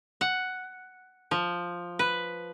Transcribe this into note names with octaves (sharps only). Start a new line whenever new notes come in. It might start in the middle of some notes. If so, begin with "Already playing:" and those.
F#5
F3
B4